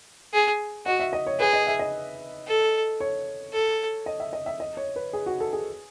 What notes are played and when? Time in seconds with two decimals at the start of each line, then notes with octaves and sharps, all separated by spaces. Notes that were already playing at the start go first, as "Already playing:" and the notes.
0.33 G#4
0.86 F#4 D#5
1.00 E5
1.13 D#5
1.27 C#5
1.40 G#4 B4
1.53 D#5
1.67 E5
1.79 D#5
2.47 A4
3.00 C#5
3.53 A4
4.06 D#5
4.20 E5
4.33 D#5
4.46 E5
4.60 D#5
4.77 C#5
4.96 B4
5.13 G#4
5.26 F#4
5.40 A4
5.53 G#4